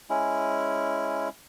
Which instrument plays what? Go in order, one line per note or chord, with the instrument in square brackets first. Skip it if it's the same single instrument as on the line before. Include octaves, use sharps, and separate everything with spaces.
[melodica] G#3 C#4 E4